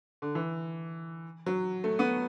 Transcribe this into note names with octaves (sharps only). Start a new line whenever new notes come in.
D3
E3
F#3
A3
B3